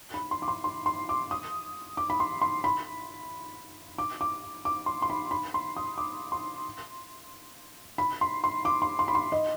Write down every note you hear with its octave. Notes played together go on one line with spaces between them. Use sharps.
B5
C6
D6
C6
C6
C6
D6
D#6
D6
B5
C6
C6
B5
D6
D6
D6
C6
C6
B5
B5
C6
D#6
D6
C6
B5
C6
C6
D6
C6
C6
B5
C6
D#5